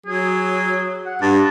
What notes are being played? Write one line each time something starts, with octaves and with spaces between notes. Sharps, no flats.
F#3 G#4
F#5
G2 A5